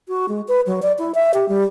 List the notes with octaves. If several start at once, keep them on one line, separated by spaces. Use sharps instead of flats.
F#4
G#3
B4
F#3
D5
E4
E5
G4
G3